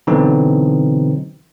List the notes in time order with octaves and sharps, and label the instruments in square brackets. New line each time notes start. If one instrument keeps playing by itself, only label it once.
[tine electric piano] B2 D3 E3 F#3 C4 D#4